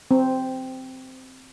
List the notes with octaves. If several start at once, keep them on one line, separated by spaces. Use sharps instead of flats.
C4